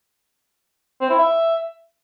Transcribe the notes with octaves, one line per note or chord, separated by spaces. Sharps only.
C4
E4
E5